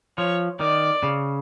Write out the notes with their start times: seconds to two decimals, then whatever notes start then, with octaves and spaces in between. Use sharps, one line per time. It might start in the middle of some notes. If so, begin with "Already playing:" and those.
0.18 F3 C#5
0.60 D#3 D5
1.03 C#3